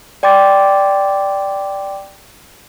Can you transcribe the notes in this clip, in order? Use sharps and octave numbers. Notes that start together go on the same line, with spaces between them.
D5 G5 C6 D6 A6